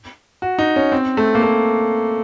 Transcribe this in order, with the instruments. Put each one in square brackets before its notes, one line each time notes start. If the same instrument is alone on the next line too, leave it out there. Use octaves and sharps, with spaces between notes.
[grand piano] F#4
D#4
C#4
C4
A3
A#3
A3